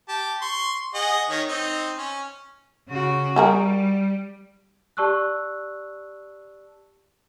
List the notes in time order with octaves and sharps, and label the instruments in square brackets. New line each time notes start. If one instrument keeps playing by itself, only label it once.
[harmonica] G4 A5
C6 C#6
G#4 D#5 F#5
D#3 C#5 D#5
C4 D#4
C#4
[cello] C#3 F#4
[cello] G3 [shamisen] G4 G#4 A#4
[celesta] G4 D5 A5 C#6 E6 F#6